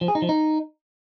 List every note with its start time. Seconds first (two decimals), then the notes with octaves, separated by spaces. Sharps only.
0.01 F3
0.08 G#4
0.15 D#4
0.22 F3
0.29 D#4